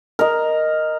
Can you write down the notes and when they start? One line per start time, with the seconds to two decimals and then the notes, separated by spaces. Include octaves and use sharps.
0.19 A#4 D#5